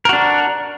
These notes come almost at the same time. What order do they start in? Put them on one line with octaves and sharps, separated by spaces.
A#4 F#4 D4